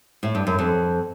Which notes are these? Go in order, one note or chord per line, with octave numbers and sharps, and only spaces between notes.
A2
G2
F#2
F2